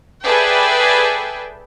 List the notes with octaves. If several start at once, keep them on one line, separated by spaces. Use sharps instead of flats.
G#4 A4 B4 D5 E5 G5